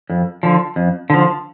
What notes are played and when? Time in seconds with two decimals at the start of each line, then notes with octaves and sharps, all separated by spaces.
0.10 F2
0.43 D3 F3
0.76 F2
1.10 D3 F3